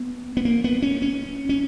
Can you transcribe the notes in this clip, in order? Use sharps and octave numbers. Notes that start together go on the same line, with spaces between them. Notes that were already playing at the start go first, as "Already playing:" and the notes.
Already playing: B3
B3
A#3
B3
C#4
C#4
C#4